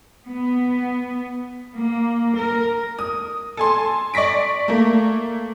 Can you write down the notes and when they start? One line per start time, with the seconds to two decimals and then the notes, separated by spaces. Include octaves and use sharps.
0.28 B3
1.75 A#3
2.37 A#4
2.99 D#6
3.57 A4 G#5 C6
4.14 D5 C#6 A#6 B6 D7
4.68 A3 A#3